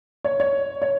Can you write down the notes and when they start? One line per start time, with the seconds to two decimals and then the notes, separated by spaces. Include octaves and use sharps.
0.24 C#5
0.40 C#5
0.82 C#5